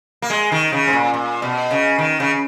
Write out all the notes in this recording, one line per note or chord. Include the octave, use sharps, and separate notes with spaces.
A#3
G#3
D#3
C#3
G#2
A#2
A#2
B2
C#3
D#3
C#3